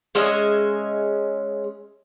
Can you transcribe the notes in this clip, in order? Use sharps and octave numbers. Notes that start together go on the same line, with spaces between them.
G#3 C#4 D#5 E5